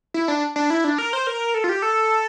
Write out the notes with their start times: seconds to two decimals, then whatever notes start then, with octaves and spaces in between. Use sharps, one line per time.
0.14 E4
0.28 D4
0.56 D4
0.70 E4
0.84 D4
0.98 A#4
1.13 C5
1.27 A#4
1.54 A4
1.64 F4
1.69 G4
1.82 A4